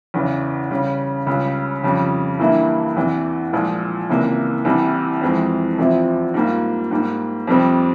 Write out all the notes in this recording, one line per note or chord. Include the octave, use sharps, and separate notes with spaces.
E2 C#3 E3
C#3 G3 C#4
C#2 C#3 G3
F2 C#3 G3
G2 E3 G3 A#3 E4
E2 C3 E3
C2 A#2 F3 G#3
C#2 C3 E3 A#3
C2 C3 E3 G3
F2 E3 G#3 C4
E2 C3 F3 C4 E4
G#2 G3 A#3 F4
G#2 G3 A#3
F2 C3 G3 C4